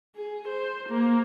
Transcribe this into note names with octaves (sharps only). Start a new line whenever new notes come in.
G#4
C5
A#3